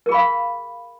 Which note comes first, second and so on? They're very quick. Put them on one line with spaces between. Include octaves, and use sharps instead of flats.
A#4 G#4 B5 F5